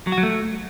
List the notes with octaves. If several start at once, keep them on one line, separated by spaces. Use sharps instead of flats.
F#3
F#4
F#3
A3